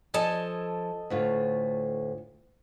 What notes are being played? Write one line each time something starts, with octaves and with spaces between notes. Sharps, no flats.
F3 A4 D#5 G#5
D2 A2 F4